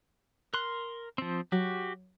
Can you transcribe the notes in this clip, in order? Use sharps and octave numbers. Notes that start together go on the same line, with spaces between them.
A#4 C6 F#6
F3 C4
F#3 F#4 G4